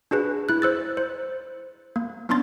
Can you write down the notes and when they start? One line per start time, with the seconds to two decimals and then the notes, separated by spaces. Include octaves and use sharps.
0.11 D4 F#4 G#4 B4
0.49 E4 F#6
0.62 C5 E6 A6
0.97 C5
1.96 A#3
2.29 B3 C#4 D4 C6 A6